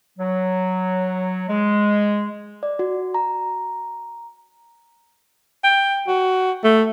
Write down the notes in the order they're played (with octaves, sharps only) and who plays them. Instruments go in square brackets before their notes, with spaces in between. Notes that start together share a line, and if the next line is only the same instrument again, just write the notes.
[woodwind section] F#3
G#3
[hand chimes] D5
F#4
A#5
[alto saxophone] G5
F#4
A3